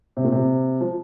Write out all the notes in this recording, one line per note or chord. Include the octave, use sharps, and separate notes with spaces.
C3
A#2
C3
F3